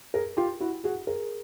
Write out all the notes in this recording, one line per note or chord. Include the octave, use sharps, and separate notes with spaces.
G#4 A#4
F4 G4
E4 F#4
F#4 G#4
G#4 A#4